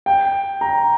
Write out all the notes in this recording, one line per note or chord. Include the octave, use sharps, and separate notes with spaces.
G5
A#5